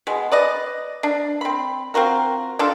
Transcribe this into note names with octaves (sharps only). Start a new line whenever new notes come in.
B2 G#3
B4 D5 D#5
D4
C4 B5
C4 F4 F#4 A#4
D4 F4 A4